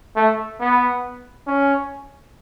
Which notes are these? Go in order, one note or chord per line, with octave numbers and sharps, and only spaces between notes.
A3
B3
C#4